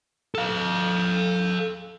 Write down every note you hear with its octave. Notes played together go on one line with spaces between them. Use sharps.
A4 F5